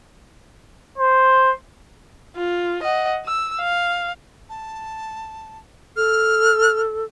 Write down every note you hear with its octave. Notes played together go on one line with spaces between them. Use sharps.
C5
F4
D#5 F#5
E6
F5
A5
A4 F6